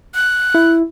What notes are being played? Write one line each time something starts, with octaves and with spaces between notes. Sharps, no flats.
F#6
E4